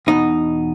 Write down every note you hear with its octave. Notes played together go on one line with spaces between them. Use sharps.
E2 B2 D#4